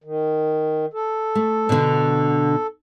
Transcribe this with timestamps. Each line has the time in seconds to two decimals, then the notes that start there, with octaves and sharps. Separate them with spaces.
0.04 D#3
0.94 A4
1.35 A3
1.69 B2 D3